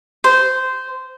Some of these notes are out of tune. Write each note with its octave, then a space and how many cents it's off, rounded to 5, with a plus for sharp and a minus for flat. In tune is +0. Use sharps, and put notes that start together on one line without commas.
C5 -15